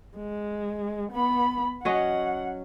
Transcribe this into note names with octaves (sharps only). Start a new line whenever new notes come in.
G#3
B3 B5
F#3 C#4 D#5 F#5